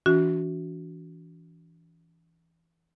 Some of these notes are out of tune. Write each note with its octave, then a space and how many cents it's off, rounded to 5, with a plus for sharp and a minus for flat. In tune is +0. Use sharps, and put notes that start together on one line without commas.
E3 +0 D4 -45 F#4 +0